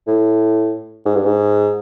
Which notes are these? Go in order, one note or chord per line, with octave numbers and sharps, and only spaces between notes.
A2
G#2
G2
G#2